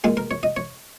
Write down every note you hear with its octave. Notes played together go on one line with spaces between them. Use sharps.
A#2 G#3 G#4
A#4
C#5
D#5
C#5